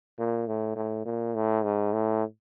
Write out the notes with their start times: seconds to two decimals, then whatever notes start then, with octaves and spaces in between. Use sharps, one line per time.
0.18 A#2
0.47 A2
0.76 A2
1.06 A#2
1.35 A2
1.64 G#2
1.93 A2